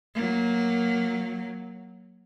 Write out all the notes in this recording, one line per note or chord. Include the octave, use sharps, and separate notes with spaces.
F#3 A#3